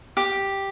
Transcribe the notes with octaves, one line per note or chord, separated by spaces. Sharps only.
G4